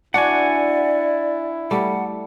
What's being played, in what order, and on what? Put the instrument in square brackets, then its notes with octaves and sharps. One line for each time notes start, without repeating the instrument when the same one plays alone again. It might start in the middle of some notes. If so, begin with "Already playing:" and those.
[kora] D4 F#4 [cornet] E4 [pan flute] D5 [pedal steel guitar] F#5 G#5
[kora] G3 A3 [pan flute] F#5